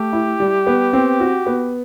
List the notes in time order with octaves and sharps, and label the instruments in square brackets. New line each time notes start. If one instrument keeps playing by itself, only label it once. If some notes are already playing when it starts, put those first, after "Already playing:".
Already playing: [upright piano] A3 [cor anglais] G4
[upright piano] E4
G3
B3
C4
F#4
B3